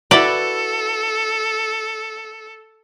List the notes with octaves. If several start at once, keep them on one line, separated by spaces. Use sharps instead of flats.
E4 F#4 A4 B4 D5